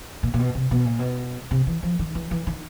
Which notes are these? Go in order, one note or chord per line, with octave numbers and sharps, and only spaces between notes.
A#2
A#2
B2
C3
B2
A#2
B2
C3
E3
F3
D#3
E3
E3
D#3